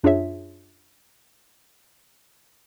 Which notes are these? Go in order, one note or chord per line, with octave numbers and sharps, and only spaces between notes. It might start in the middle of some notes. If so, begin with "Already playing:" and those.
F#2 D4 F4 G#4 C#5 E5